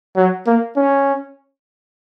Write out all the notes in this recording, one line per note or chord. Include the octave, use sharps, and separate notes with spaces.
F#3
A#3
C#4